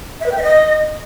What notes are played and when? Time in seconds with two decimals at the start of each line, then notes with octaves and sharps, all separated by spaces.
0.20 E5
0.26 B4
0.32 G5
0.37 E5
0.43 D#5